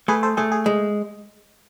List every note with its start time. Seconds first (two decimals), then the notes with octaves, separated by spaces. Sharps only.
0.08 A3 G#4 B4
0.23 A4 C5
0.37 A3 G#4
0.52 G#4
0.66 G#3